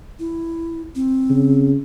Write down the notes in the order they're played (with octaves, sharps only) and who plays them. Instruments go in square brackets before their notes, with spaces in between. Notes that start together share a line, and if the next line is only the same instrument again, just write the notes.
[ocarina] E4
C4
[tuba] C#3